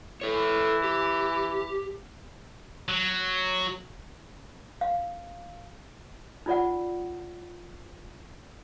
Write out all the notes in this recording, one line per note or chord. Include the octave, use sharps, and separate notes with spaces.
E3 A4 C#5
G4
F#3
F5
D#4 F4 D5 F#5